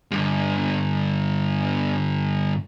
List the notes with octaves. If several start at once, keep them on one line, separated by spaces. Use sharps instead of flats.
G2 D3